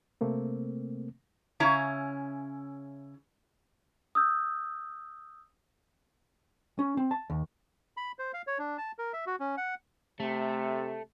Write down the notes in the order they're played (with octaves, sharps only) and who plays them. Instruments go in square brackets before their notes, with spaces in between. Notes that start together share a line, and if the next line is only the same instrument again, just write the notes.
[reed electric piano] C3 A3 A#3 C4
[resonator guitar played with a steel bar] C#3 C#4 E4 A#5
[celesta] D#6 E6 G6
[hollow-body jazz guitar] C#4
C4
A5
D#2
[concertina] B5
C5
F5
C#5
D4
A5
A#4
E5
F#4
C#4
F#5
[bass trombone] C3 [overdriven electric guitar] A3